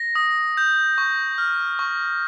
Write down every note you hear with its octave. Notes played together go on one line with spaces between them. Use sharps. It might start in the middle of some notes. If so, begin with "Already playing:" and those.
Already playing: A#6
D#6
G6
C#6
F6
C#6